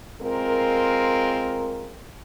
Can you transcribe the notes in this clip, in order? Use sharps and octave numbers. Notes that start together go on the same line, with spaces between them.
G#3 C4 F4 A#4